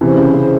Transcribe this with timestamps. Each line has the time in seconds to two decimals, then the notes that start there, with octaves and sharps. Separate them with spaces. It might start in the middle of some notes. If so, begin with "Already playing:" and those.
0.01 C3 E3 C#4 E4 G#4 C5
0.18 C#3
0.34 C#3